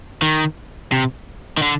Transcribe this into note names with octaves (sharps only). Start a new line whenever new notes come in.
D#3
C3
D#3
D3